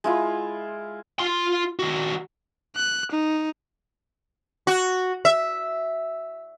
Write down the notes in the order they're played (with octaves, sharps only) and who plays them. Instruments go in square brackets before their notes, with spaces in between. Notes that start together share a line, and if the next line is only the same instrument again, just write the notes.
[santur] G#3 E4 F4
[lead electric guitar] F4 C6
D#3 F#4
[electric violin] F#6
D#4
[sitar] F#4
E5